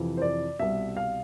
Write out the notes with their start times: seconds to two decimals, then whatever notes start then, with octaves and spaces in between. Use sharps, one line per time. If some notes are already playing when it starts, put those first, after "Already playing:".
Already playing: F2 C3 E3
0.17 C5
0.22 D5
0.59 C2 B2 E5
0.97 F5